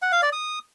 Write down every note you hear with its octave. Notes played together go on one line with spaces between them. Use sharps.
F#5
F5
D5
D#6